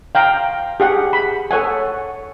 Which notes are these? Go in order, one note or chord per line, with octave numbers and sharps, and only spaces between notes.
F5 G5 A#5
G4 G#4 F#5
B5
A4 C#5 F#5 G#5